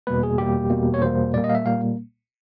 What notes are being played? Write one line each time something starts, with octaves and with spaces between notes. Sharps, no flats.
E2 B2 G3 A#3 B4
G#4
E2 B2 G3 A#3 G4
E2 B2 G3 A#3
C#5
E2 B2 G3 A#3 C5
A#2 G3 A#3 D5
D#5
F5
E5
A#2 G3 A#3 F5